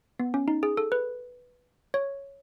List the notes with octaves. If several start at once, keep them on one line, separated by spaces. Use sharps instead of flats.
B3
C#4
D#4
G#4
A4
B4
C#5